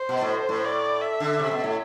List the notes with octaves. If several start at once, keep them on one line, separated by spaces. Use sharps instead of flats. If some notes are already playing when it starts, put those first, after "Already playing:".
Already playing: C5
B2
A2
A2
D5
E5
D3
C3
B2
A2